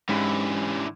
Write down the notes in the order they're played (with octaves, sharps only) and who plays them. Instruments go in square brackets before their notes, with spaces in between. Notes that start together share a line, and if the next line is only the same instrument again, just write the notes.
[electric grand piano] G#2 B5 [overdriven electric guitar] D3 E3 [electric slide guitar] G#3 C#4 G4